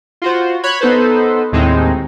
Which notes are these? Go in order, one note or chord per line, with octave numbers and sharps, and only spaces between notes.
F4 F#4 C5
C#5 B5 F#6 G#6
B3 D#4 A4 B4 C5
D#2 A2 G#3 C4 D#4